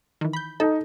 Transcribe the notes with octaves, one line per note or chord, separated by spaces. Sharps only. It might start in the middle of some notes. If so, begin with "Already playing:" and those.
D#3 E3
B5 G6
D#4 A4